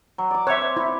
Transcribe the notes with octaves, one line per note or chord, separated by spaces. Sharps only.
F#3
D5 D6
C4 C5 C#5 E5
C5
E4